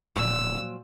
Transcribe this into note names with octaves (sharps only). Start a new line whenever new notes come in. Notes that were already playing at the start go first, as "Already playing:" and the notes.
D1 A#2 F3 F#3 E6